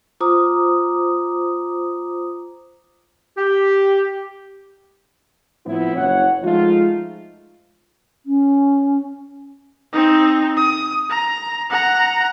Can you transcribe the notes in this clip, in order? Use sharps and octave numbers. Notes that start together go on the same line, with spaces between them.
F4 C5 A#5 D6 D#6
G4
A2 F3 B3 C4 E4
F#1 C#5 F#5
F3 G#3 A3 D#4 F4
C#4
C4 D#4
D#6
A#5
F#5 A#5